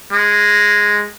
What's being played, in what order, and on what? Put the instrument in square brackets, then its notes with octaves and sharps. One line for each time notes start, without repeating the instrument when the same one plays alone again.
[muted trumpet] G#3